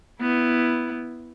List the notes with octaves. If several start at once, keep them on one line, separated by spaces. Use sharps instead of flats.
B3 E4